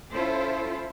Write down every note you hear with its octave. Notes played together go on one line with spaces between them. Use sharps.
C#4 E4 F4 A4 C5